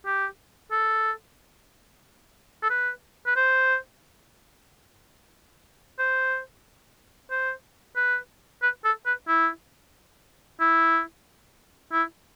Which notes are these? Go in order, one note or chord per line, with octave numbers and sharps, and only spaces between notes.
G4
A4
A4
B4
B4
C5
C5
C5
B4
B4
A4
B4
E4
E4
E4